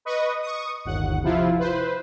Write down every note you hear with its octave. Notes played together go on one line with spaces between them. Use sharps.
B4 D#5 C#6 D#6
C#6 D#6
G1 D#2 F#5
C3 F3 E4 F4
B4 C5